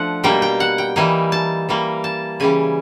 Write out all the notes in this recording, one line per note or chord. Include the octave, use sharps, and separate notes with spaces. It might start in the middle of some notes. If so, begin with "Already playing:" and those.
Already playing: F3 A3 D4 F#5
B2 G3 A#3 G5
G5
F#5
G5
E3 G3 A#3 D#4 G#5
A5
E3 G3 A#3
A5
C#3 E3 G3 G#5